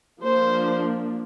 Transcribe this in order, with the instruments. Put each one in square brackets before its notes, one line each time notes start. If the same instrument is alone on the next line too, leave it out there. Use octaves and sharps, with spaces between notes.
[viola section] F3 A#3 D4 C5